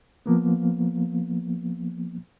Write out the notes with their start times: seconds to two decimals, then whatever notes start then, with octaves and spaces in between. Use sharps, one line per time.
0.26 F3 A#3 B3